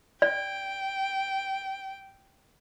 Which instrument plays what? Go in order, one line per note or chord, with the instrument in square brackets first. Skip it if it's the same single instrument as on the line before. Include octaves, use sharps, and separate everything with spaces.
[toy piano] D5 [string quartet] G5